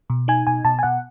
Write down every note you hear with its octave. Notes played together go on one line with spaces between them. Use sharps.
B2
D#4 G#5
B2 G#5
B2 A5
G#5
B2 F#5